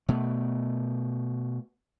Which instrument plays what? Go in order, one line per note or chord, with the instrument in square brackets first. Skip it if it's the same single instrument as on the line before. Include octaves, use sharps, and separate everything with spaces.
[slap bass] B2 A3